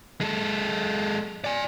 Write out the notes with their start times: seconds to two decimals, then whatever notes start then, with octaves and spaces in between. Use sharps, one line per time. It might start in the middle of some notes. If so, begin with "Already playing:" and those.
0.21 G#3 A4
1.44 D5 G#5